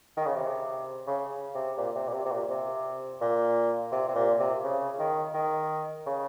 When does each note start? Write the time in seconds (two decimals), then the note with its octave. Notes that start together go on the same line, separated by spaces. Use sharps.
0.17 D#3
0.26 C#3
0.36 C3
1.07 C#3
1.55 C3
1.78 A#2
1.95 C3
2.08 A#2
2.14 C3
2.25 C3
2.31 A#2
2.50 C3
3.21 A#2
3.92 C3
4.08 C3
4.15 A#2
4.39 C3
4.63 C#3
4.99 D#3
5.34 D#3
6.06 C#3